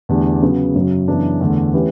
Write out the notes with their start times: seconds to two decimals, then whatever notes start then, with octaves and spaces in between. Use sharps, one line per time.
0.09 E2 D3 A3 D4 G4
0.43 C#3 F#3 B3
0.75 F#2 C#3 F#3
1.08 F#2 C#3 E3 B3 D4
1.40 E2 D3 A3 D4
1.74 E3 A3 C#4 G4 B4